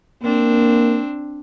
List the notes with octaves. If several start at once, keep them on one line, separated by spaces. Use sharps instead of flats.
A#3 C4 D4